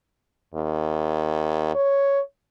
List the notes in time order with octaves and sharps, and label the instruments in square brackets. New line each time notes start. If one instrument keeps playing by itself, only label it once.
[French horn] D#2
C#5